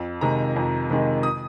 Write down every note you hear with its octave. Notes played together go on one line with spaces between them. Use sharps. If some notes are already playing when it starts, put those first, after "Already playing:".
Already playing: F2
C3 D#3 G#3 A#5
F2
C3 D#3 G#3
D#6